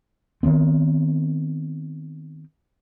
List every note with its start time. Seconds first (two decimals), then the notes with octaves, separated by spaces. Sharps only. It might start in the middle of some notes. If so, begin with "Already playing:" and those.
0.43 D#3 E3 B3 C4